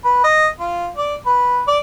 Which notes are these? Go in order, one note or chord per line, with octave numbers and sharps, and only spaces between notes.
B4
D#5
F4
D5
B4
D5